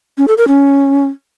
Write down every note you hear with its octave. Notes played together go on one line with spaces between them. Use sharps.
C#4
A4
A#4
C#4